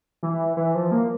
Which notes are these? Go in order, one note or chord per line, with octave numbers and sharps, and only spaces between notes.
E3
E3
F3
A#3